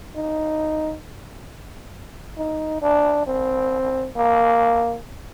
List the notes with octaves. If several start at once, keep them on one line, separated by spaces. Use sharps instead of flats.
D#4
D#4
D4
C4
A#3